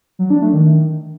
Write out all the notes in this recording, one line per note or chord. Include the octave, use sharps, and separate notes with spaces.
F#3
D4
A3
D#3